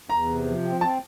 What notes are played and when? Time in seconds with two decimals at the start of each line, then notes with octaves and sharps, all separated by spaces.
0.09 E2 A#5
0.27 C3
0.46 F3
0.64 C4
0.81 C4 A5